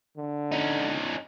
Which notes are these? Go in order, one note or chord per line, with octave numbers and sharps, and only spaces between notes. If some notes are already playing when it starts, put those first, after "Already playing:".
D3
C#4 D#4